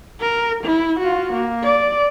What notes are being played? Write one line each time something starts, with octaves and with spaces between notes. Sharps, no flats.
A#4
E4
F4 F#4
A#3
D5